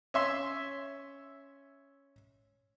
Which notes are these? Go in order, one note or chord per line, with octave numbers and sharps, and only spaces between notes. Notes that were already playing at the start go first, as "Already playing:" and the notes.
C#4 E5 C6